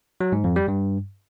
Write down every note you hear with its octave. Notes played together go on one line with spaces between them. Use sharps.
F#3
G#2
F2
G3
G2